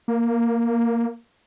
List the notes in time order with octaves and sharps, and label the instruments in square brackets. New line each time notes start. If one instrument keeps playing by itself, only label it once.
[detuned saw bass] A#3